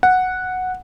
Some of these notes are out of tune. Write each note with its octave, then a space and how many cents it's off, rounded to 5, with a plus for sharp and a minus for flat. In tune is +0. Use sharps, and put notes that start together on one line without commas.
F#5 -5